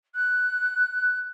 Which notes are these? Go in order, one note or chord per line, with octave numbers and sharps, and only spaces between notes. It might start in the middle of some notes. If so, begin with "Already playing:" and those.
F#6